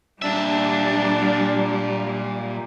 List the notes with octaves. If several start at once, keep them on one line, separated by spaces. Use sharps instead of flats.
A#2 G3 D4 E5